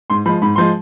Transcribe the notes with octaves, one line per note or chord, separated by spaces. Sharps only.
G#2 C6
F3 G#3 B5
G#2 B5
F3 G#3 C6